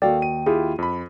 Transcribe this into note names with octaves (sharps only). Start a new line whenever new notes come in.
D#2 F#4 A4 D5 F5 G5
D#7
E4 F4 G4 G#4
F2 B5